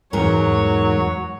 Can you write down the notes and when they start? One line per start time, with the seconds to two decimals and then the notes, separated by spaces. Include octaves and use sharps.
0.13 E2 G#2 F#3 A#4 C#5